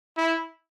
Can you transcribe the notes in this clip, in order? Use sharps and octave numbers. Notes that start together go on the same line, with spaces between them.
E4